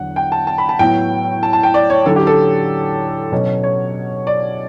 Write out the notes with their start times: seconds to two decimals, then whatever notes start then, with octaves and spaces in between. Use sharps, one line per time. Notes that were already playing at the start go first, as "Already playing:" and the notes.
Already playing: E2 D3 F#3 F#5
0.16 G5
0.32 A5
0.47 A5
0.58 B5
0.69 A5
0.79 A2 F#3 B3 E4 G5
1.43 A5
1.53 A5
1.63 G5
1.74 D5
1.90 C#5
2.06 D3 F#3 C#4 E4 A4
2.16 G4
2.27 A4
3.32 B2 F#3 C#4
3.63 C#5
4.27 D5